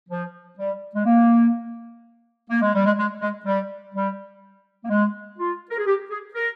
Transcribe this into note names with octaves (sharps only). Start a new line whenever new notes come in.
F3
G3
G#3
A#3
A#3
G#3
G3
G#3
G#3
G#3
G3
G3
A#3
G#3
F4
A#4
G#4
G4
G#4
A#4